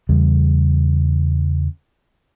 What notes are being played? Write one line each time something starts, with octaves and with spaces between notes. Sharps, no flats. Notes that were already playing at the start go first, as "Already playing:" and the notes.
E2 C#3 G3